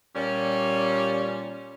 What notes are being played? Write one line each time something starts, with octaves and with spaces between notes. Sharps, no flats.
A#2 G3 C#4